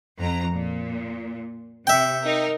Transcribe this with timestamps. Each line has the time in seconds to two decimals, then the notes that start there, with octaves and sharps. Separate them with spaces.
0.19 F2 A#5
0.54 A#2
1.87 C3 E5 G5
2.24 D#4 A#4